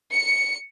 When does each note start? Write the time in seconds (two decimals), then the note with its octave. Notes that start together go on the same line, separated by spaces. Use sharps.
0.12 C#7